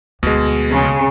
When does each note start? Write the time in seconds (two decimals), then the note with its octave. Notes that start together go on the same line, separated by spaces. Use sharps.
0.23 D2 B2 G#3
0.71 C#3